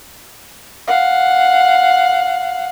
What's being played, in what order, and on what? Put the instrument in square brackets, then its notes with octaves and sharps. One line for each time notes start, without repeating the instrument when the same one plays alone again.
[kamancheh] F5 F#5